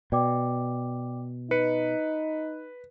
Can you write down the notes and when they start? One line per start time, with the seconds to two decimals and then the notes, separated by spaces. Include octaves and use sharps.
0.12 B2 D5 G5 D6
1.51 D#4 B4 C#7